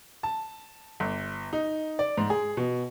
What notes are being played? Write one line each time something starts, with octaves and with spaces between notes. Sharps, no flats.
A5
G1
D#4
D5
G#2
G#4
B2